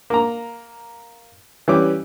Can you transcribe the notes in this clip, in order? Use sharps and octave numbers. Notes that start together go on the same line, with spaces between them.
A#3 A#5
E3 G3 C#4 D6